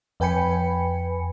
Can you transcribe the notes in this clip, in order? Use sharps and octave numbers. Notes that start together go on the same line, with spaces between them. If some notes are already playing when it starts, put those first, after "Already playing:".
F2 B4 G5 G#5 B5 C#7